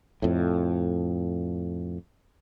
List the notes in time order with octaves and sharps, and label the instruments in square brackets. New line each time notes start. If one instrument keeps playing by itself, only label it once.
[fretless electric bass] F2 A2